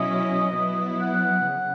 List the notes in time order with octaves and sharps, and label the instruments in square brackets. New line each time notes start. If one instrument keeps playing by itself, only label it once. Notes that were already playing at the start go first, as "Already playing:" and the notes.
Already playing: [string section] B2 F#3 C#4 E4 [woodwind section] D#5
[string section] F#3 B3 E4
[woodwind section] F#5
[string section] C#3